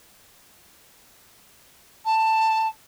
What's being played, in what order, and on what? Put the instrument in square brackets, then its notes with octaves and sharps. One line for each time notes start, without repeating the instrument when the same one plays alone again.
[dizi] A5